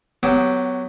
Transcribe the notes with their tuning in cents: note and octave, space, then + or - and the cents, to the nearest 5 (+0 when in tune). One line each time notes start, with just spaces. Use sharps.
F#3 +0 B3 +25 G4 +0